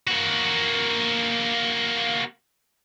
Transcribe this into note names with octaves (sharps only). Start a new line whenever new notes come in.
A#3 F#4